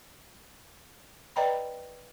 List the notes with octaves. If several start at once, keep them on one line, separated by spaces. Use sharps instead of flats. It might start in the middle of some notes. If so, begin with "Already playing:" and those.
B4 D5 D#5 G5 A#5 B5